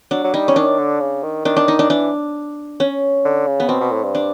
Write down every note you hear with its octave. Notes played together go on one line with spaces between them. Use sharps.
F#3 D4
F#3
G3 D#4
C#4
D#3 D4
D3
C#3
D#3
D#3 D4
D4
D#4
D4
E3 D4
C#4
D3
C#3
B3
B2 C4
B2
A2
G2
D4